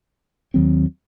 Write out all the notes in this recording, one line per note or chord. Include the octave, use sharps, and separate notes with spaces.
D#2 D#3 F#3 C4